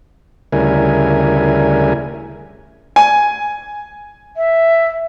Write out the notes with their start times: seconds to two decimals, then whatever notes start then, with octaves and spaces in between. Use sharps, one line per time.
0.53 D2 C#3 G3 E4 A#4 G#5
2.96 G#5
4.37 E5